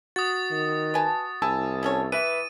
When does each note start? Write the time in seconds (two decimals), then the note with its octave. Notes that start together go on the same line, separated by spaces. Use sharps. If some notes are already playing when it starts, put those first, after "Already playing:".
0.16 F#4 D#6 A6
0.51 D#3
0.94 B4 G#5 A5
1.42 C2 E4 G#5 A5 E6
1.83 C#4 A4 C#5
2.12 E3 B4 E5 D#7